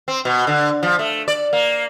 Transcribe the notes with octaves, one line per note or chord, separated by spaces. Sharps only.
C4
B2
D3
F3
A3
D5
A#3